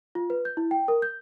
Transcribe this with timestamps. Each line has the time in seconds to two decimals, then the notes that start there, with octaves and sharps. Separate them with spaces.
0.15 F4
0.30 B4
0.45 G6
0.57 E4
0.71 G5
0.88 A#4
1.02 G6